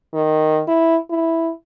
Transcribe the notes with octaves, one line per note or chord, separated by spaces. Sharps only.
D#3
E4
E4